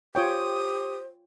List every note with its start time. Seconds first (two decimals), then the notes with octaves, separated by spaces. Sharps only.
0.15 F4 G4 C5 C#5 G5 D#6